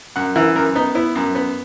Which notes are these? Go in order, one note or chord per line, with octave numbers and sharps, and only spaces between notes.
F#2 F#5
E3 A#4
F#2 A#4
B3 D#4
B3 E4
F#2
B3